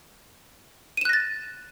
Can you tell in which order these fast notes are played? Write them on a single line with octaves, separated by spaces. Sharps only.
D#7 E7 F#6 A#6 A6